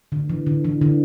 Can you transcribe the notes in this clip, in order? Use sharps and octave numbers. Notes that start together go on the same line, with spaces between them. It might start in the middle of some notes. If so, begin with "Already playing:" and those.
D3
E3
D3
E3
D3